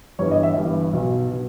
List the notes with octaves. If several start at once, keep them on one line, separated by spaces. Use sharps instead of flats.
G1 G2 E3 C#5
D#5
E5
G1 G2 E3
B1 B2
B2